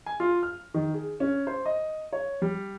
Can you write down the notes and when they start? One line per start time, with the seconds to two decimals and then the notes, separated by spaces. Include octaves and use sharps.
0.06 G#5
0.20 F4
0.43 F6
0.74 D#3
0.94 G#4
1.20 C#4
1.47 C5
1.66 D#5
2.13 C#5
2.42 G3